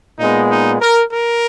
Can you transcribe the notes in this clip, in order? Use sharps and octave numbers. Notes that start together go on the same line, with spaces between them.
A#2 G#3 B3 D#4
D#4
A#4
A#4